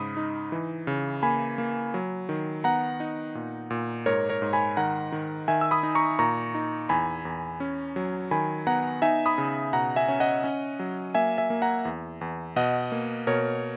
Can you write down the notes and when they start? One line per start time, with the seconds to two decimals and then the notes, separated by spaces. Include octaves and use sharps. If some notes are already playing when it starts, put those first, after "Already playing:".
Already playing: G#2 C#3 B5 D#6
0.17 D#4
0.52 E3
0.87 C#3
1.23 A#3 G#5 B5
1.58 A#3
1.94 F#3
2.29 D#3
2.64 B3 F#5 A#5
3.00 D#4
3.35 A#2
3.70 A#2
4.06 G#2 A#4 C#5
4.29 A#4 C#5
4.42 G#2
4.53 G#5 B5
4.77 D#3 F#5 A#5
5.12 D#3
5.48 D#3 E5 G#5
5.61 E6
5.71 B5 D#6
5.83 D#4
5.95 A#5 C#6
6.19 A#2 A#5 C#6
6.55 D#4
6.89 E2 G#5 B5
7.25 E2
7.60 C#4
7.96 F#3
8.31 D#3 G#5 B5
8.67 B3 F#5 A#5
9.02 D#4 E5 G#5
9.26 B5 D#6
9.38 C#3
9.73 B2 F#5 A#5
9.96 E5 G#5
10.08 C#4
10.20 D#5 F#5
10.44 C#4
10.79 F#3
11.15 A#3 E5 G#5
11.38 E5 G#5
11.50 A#3
11.62 F#5 A#5
11.85 E2
12.21 E2
12.56 B2 D#5 F#5
12.92 A#3
13.27 B2 A#4 C#5